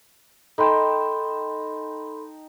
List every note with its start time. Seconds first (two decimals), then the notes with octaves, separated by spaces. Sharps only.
0.58 D#4 A4 G5 A5 B5 C6